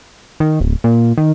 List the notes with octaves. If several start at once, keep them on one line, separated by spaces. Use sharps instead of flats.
D#3
D1
A#2
D#3